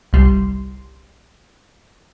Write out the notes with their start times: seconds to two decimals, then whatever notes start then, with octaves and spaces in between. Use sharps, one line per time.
0.13 G1 C2 G3 C6